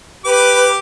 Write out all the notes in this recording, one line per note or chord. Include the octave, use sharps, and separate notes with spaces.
G4 B4 D6